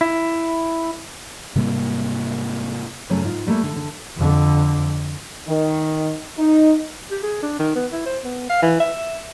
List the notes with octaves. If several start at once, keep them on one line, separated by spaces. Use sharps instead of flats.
E4
G#2 C3 G3 A#3
F#2 C#3 F#3 A3 C#4
G#2 F4
G3 A3 A#3
D3
D3
F2 D3
D#3
D#4
G4
G#4
D4
D#3
B3
E4
C5
B3
F5
E3
E5